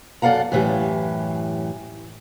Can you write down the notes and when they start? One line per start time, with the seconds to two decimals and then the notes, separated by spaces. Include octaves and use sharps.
0.22 F#2 A4 D5 F5 F#5 A#5
0.52 F#2 A2 E3 G4